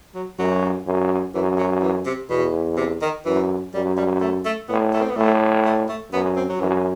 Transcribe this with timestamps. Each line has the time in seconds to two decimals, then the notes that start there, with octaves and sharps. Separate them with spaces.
0.14 F#3
0.39 F#2 F#3
0.87 F#2
1.34 F#2 E3
1.58 F#3
1.82 E3
2.06 C3
2.30 E2 B2
2.77 C3
3.02 D#3
3.25 F#2 E3
3.74 F#2 G3
3.97 G3
4.21 A3
4.45 A3
4.68 A2 B3
4.93 A3
5.01 C4
5.10 B3
5.17 A2 A3
5.65 A3
5.89 A3
6.12 F#2 B3
6.36 C4
6.49 F#3
6.60 F#2 E3